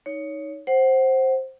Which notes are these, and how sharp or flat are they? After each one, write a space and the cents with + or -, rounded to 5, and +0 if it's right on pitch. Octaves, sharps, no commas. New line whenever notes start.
D#4 +10 C#5 +15
C5 +10 F#5 +15